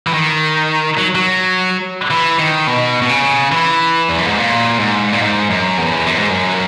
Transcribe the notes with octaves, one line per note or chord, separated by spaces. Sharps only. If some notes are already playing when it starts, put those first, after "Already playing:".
E3
D#3
F#3
F#3
E3
D#3
B2
B2
C#3
E3
E2
F#2
G#2
A#2
G#2
A#2
G#2
F#2
E2
F#2
G#2
F#2